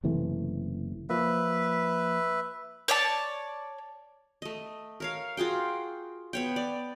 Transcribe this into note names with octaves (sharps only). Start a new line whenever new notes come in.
F#1 C3 E3 A3
F3 A#3 B4 E5
C#5 D5 A5
A3 D#5
A#4 C#5 F5
F4 F#4 G#4 G5
B3 C#5 G5
D5